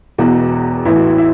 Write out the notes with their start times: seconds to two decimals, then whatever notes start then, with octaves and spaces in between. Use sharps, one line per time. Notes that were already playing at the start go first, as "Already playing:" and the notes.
0.18 E1 E2 B2 F#4
0.85 A1 A2 E3 E4
0.96 F#4
1.07 E4
1.18 E4